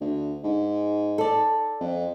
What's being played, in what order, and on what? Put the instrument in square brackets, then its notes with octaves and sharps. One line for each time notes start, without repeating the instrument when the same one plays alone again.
[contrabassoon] D2
G#2
[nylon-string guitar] A4 D5
[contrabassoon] F2